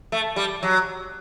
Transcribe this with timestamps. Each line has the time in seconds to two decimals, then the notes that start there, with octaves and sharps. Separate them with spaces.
0.12 A3
0.36 G3
0.63 F#3